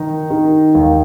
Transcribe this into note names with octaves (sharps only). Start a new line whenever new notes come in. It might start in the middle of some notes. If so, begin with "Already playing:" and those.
Already playing: D#3 D#4
D#3
D#2